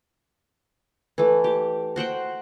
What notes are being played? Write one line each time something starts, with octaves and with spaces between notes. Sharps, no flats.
E3 A3
G4
F#4 C5 F#5 G5